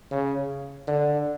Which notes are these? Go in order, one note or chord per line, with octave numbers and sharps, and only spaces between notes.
C#3
D3